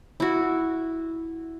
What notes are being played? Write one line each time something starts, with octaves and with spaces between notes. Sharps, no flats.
E4 F#4